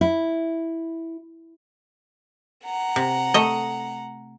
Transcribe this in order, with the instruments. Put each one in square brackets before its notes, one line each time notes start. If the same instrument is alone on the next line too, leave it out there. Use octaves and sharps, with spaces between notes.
[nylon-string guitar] E4
[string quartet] F#5 A#5
[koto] C3
A3 D#5